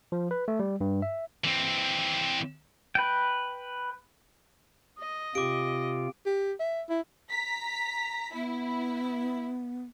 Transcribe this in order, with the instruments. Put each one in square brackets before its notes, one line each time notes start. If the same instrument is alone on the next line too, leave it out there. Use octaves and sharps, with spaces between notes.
[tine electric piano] F3
B4
A3
G3
G2
E5
[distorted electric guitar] E3 C4
[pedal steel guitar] B4 G5
[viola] D#5
[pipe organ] C3 F4 [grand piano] G4 [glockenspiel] D6 D7
[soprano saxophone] G4
E5
E4
[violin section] A#5 B6
[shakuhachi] B3 [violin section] E4